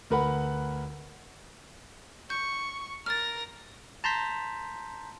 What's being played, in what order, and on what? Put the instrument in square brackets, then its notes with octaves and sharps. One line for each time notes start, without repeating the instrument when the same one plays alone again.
[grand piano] D2 A#4 B4 F#5 B5
[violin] C#6 [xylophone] G6
[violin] A#4 A#6 [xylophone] F6 A6
[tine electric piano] A5 A#5 C6 G6 B6